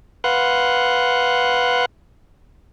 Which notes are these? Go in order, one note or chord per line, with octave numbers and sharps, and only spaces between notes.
B4 F5 F#5 C6 F#6